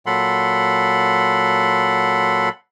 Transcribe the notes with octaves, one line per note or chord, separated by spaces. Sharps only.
A#2 F#3 A4 F#5 B5 C6